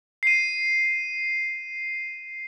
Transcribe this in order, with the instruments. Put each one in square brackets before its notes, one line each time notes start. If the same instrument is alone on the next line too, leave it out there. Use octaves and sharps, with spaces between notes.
[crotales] C7 D#7